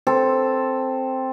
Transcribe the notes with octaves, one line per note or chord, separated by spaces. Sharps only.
C4 A4